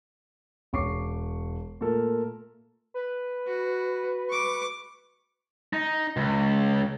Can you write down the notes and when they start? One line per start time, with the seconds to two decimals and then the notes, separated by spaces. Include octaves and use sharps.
0.73 E1 C#5 C#6 D6 C7
1.81 A#2 A3 A4 A#4
2.94 B4
3.47 F#4
4.30 C#6 D6
5.73 D#4
6.17 C#2